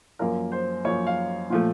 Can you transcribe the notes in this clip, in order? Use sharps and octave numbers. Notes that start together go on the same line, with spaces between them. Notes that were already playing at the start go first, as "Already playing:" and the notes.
F#2 F3 A#3 A#4
C5
F#2 F3 A#3 C#5
F5
A#2 F3 A3